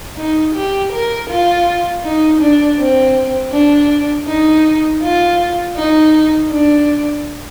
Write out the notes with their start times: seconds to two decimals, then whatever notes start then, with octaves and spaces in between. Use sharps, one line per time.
0.17 D#4
0.55 G4
0.92 A#4
1.30 F4
2.04 D#4
2.41 D4
2.79 C4
3.53 D4
4.27 D#4
5.02 F4
5.76 D#4
6.51 D4